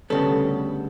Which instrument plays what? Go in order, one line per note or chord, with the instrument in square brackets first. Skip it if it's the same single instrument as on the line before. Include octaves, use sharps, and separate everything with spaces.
[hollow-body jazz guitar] D2 C#3 G3 B3 A4